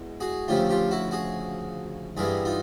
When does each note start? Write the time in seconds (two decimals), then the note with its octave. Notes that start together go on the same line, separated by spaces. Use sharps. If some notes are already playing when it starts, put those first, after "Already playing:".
Already playing: E2 B2 G#3
0.20 F#4 G#4
0.48 D2 C#3 F3 A3 F4 G4
0.69 F4 G4
0.91 E4 F#4
1.11 F#4 G#4
2.17 G2 E3 G3 B3 G#4 A#4
2.45 D#4 F4